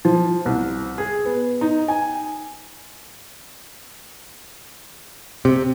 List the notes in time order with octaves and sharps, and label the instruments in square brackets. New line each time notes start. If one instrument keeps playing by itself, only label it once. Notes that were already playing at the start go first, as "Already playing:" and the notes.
[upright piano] F3
C2
G#4
B3
D#4
G#5
[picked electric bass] C3